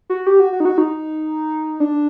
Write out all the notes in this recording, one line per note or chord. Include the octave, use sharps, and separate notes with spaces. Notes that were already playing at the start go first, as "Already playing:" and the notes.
F#4
G4
F#4
F#4
D#4
F#4
D#4
D4